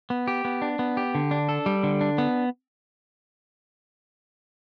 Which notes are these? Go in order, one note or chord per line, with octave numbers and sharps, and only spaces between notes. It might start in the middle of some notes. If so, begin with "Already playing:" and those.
B3
G4
B3
D4
B3
G4
D3
D4
A4
G3
D3
D4
B3